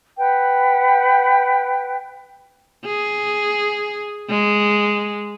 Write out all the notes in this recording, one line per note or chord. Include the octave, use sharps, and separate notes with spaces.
B4 F#5 G5
G#4
G#3